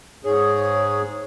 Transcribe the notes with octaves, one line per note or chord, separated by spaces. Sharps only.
G#2 G#4 C#5